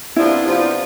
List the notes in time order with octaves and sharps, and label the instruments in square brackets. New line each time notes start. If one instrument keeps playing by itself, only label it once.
[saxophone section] C3 F3 B3 D4 F4 [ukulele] E4
[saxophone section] C3 F3 B3 D4 F4